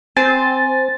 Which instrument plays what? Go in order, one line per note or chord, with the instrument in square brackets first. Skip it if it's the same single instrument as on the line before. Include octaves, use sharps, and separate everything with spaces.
[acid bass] C4 [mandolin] C5 [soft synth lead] G#5 [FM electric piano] A6